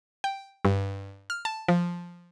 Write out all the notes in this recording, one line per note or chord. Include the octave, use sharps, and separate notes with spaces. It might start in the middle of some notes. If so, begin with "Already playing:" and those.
G5
G2
F6
A5
F3